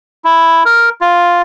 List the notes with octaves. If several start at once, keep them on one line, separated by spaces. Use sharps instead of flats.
E4
A#4
F4